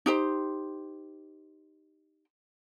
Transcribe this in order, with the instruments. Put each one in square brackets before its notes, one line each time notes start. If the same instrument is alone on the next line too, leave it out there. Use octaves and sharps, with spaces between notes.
[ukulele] D#4 G4 C5